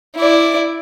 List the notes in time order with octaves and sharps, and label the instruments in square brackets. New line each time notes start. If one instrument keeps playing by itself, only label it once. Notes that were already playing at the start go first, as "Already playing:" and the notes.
[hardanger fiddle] E4 D5